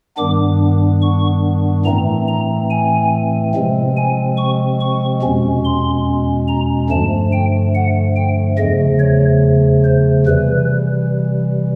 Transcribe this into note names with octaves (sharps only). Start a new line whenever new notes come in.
G2 D#3 G3 B3 D4 D6
C#6
A2 E3 A3 C4 A#5
A#5
G#5
C3 F3 G#3 C4
G#5
C#6
C#6
E2 B2 G#3 C#4
C6
A#5
G2 D3 F3 A3 A5
G5
F#5
G5
E2 C#3 F3 A3 D#5
C#5
C5
C3 E3 G3 B4